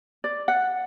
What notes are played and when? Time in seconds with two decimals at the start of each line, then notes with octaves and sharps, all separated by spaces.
0.24 D5
0.48 F#5